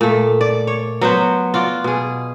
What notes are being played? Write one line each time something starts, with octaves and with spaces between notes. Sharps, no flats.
A#2 A3
D5
C#5
F#3 B3 B4 C5
F4 F#4 D5
B2 G#4